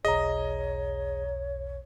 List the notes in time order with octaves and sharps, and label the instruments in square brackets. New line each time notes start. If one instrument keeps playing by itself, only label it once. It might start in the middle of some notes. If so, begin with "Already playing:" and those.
[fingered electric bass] E1 B1 [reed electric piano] G#4 A#5 [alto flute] C#5 [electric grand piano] D#5